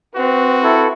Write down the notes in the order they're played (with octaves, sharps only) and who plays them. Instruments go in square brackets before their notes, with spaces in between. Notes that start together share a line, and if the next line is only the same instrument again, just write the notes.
[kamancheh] C4 B4 [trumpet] F#4
[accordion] E4 A4